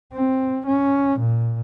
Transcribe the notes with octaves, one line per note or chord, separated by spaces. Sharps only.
C4
C#4
A#2